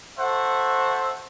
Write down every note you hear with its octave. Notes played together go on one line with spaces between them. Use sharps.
F#4 A4 C5 E5 F#5